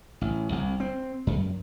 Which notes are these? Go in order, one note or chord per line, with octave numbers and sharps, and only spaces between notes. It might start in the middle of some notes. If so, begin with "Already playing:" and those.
A1
C2
C4
F#2